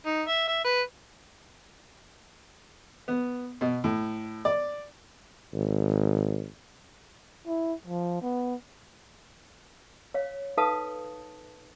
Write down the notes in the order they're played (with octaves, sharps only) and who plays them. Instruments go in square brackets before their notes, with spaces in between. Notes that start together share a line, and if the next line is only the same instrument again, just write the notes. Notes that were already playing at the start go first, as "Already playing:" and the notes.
[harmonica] D#4
E5
E5
B4
[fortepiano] B3
B2
A2
D5
[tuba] G#1
[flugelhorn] E4
F3
B3
[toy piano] C#5 F5
D#4 A4 B4 F5 A5 D#6